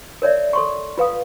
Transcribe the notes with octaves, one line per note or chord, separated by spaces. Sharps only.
A#4 C#5 D5 E5
A4 C6 C#6
F4 B4 F5 D#6